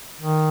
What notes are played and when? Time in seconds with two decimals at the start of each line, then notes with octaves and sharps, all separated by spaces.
0.21 D#3